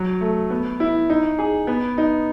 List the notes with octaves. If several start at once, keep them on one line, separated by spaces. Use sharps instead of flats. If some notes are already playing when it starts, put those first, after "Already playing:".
Already playing: F#3
A3
B3
E4
D#4
G#4
B3
D#4